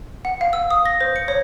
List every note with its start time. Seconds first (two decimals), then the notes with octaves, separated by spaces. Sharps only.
0.25 F#5
0.41 F5
0.53 E6
0.71 D#6
0.86 A#6
1.01 C5
1.16 C#7
1.28 C#5